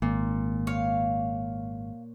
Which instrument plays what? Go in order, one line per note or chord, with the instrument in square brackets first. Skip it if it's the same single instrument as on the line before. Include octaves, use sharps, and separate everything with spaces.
[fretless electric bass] G#1 [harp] A#2
[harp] C#5 [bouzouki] F5